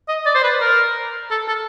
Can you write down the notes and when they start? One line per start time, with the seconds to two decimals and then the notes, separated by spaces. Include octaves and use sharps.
0.08 D#5
0.26 D5
0.35 C5
0.43 B4
0.61 A#4
1.31 A4
1.48 A4